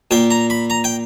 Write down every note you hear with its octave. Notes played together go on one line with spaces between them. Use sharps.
A#2 G5
A#5
B5
A#5
G5